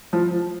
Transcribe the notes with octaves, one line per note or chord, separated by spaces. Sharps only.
F3